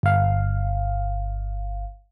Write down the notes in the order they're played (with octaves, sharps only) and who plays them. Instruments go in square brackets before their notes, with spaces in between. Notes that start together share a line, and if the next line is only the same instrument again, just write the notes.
[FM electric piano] G1 F5